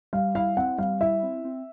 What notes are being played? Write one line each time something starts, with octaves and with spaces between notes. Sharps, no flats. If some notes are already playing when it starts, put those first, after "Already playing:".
G3 F5
E4 F5
C4 F#5
G3 F5
E4 E5
C4
C4